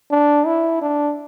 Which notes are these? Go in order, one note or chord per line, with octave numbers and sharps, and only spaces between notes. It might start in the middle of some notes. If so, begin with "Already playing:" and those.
D4
E4
D4